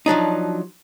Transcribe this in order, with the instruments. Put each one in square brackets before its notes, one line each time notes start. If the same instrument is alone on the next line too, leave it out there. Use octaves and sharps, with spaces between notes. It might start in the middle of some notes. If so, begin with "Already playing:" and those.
[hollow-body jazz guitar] F3 F#3 D4 D#4